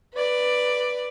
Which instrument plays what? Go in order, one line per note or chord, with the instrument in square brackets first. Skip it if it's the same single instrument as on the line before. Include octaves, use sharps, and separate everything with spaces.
[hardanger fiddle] B4 D5